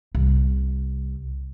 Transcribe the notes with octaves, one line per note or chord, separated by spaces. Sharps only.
C2